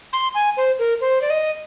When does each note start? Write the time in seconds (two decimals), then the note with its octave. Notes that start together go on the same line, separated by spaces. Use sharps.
0.13 C6
0.34 G#5
0.57 C5
0.79 A#4
1.01 C5
1.21 D5
1.30 D#5